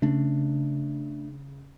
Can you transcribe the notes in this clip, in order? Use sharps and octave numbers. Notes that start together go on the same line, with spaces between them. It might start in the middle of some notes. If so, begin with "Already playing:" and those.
C#3 A3 D4